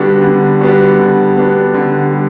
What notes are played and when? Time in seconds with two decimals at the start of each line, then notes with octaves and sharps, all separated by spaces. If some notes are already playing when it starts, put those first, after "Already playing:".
Already playing: D3 G3 B3 D4 F#4
0.22 D3
0.61 G3 B3 D4 F#4
0.99 D3
1.37 G3 B3 D4 F#4
1.74 D3
2.13 G3